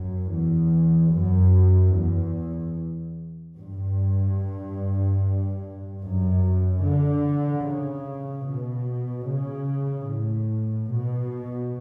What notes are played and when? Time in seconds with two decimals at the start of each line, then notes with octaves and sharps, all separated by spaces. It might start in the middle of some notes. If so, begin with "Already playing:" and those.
Already playing: F#2
0.30 E2
1.12 F#2
1.93 E2
3.57 G2
6.02 F#2
6.83 D3
7.66 C#3
8.46 B2
9.28 C#3
10.10 A2
10.92 B2